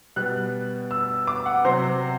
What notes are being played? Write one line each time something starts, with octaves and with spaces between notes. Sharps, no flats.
B2 G3 B3 F#6
E6
D6
F#5
C3 F#3 C4 C5